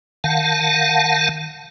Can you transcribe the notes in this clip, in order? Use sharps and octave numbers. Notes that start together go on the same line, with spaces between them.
D#3 F5 F#5 A5